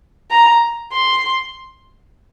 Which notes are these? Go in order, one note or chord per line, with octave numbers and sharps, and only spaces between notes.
A#5
C6